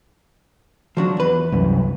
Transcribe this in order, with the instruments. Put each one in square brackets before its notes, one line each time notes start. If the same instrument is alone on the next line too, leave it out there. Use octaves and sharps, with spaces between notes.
[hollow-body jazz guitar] F3 F#3 D4
E2 B4
[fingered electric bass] C2 F#2